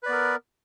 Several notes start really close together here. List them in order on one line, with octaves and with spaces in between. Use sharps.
B4 D5 B3 A#4